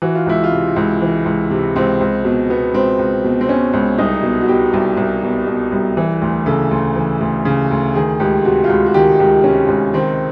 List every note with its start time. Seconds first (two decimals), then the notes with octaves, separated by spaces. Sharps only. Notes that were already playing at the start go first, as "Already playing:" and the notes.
0.02 E3 F#4
0.15 F4
0.26 C#2 E4
0.44 F4
0.52 C3
0.76 C#2
1.02 E3
1.25 C#2
1.51 C3
1.76 C#2 C4
2.01 C#2
2.24 B2
2.50 B2 B3
2.74 C#2 C4
2.99 C#2
3.24 B2
3.41 C4
3.49 B2 C#4
3.73 C#2
3.98 C2 D#4
4.23 B2
4.41 F#4
4.48 B2 G4
4.73 C2
4.97 C2
5.23 B2
5.47 B2
5.72 C2
5.97 E3
6.22 D2
6.46 C#3 A4
6.71 D2
6.96 E3
7.21 D2
7.45 C#3
7.71 D2
7.95 D#3 G#4
8.20 C#2 G4
8.45 C3 F#4
8.64 F4
8.69 C#2 F#4
8.86 F#4
8.94 D#3 G4
9.20 C#2 G4
9.44 C3 C#4
9.68 C#2
9.94 D#3 C4